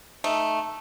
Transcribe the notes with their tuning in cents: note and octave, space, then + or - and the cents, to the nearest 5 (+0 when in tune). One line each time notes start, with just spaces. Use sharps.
A3 +0 D#4 +0